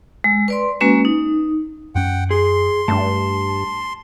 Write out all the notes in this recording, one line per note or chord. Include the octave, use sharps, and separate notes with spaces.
G#3
B4 D5 C6
G#3 A#3 C#4 F#4 B4
D#4
F#2 C#4 F#5 G5
G#4 C6
G2 A3 D4 A5